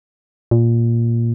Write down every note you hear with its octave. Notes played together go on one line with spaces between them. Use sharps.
A#2